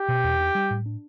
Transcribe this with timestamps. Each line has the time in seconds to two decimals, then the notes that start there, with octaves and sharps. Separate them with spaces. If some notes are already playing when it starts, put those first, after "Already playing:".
Already playing: G4
0.08 B2
0.24 E2
0.40 D4
0.55 G3
0.71 A2
0.86 D4